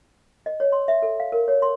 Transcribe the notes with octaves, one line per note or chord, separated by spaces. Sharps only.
D#5
C#5
C6
E5
A4
F5
A#4
C#5
C6